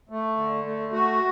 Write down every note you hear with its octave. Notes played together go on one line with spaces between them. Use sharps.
A3
D3
A3
F#4